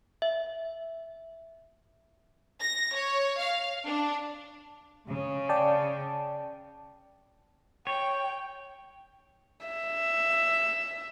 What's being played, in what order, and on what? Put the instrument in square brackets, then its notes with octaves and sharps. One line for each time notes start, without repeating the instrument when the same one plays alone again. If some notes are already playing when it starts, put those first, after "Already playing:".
[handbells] E5
[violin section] A#6
C#5
F5
D4
[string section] C#3
[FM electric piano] D5 G5 A5
[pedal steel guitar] C#5 [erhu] G5
[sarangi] E5